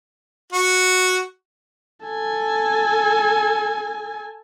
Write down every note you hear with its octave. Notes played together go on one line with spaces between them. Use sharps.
F#4
A4 G#5